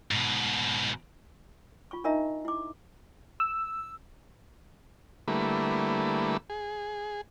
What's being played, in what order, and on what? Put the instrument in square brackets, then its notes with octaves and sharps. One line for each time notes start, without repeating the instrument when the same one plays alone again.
[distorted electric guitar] G#2 B2
[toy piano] F4 C#6
D4 D#4 A#4 D#5 E5 A#5
E4 D6
[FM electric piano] E6
[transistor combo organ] D3 G3 A3 A#3 E4 B4
G#4